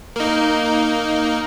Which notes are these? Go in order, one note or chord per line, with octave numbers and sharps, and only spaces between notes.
A#3 D#4